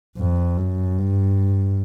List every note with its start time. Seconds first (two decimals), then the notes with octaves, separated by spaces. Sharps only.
0.17 F2
0.57 F#2
0.99 G2